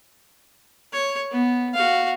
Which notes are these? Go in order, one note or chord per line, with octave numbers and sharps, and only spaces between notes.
C#5
B3
F#4 F5